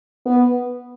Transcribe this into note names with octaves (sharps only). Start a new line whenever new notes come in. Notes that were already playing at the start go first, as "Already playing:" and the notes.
B3